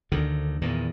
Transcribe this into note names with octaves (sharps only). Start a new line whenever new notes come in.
D2 D3 D#3
E2 A#2 D#3